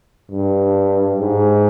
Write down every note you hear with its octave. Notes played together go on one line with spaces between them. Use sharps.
G2
G#2